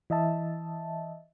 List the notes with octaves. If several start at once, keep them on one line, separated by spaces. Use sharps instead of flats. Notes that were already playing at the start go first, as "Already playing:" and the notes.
E3 D#5 E5 A5